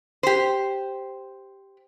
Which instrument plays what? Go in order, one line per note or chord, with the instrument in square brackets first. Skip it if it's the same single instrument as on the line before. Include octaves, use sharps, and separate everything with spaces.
[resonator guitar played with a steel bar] G4 C5